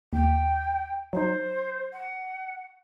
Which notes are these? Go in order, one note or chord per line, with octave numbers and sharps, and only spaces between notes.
D#2 G5
F#3 D#4 C5
F#5